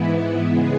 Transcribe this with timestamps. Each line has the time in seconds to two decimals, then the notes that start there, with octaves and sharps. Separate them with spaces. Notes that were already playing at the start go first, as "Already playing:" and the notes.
Already playing: G#2 E3 B3 E4
0.45 C#3 G#3 B3 G#4